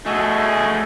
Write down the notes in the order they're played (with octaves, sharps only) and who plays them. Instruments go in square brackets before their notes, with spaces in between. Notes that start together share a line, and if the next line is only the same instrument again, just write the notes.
[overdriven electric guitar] A3 G#4 [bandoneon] F#4 D#5 G#5